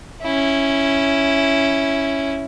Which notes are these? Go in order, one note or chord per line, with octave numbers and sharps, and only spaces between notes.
C#4 E4